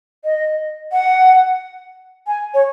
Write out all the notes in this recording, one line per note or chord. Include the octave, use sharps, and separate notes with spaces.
D#5
F#5
G#5
C#5